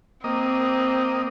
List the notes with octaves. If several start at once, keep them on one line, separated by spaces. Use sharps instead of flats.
A#3 C4 D#5